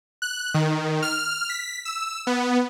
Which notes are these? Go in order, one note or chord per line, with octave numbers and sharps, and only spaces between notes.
F#6
D#3
F6
B6
E6
B3